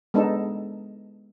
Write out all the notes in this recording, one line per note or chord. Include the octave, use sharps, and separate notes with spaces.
G#3 B3 D4 D#4 A4